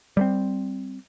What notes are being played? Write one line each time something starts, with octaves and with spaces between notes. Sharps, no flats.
G3 A3 C4